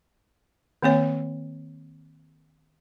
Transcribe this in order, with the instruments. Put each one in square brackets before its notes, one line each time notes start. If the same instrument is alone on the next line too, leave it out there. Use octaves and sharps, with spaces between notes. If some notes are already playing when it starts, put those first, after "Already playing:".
[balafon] D#3 A#3 C4 C#5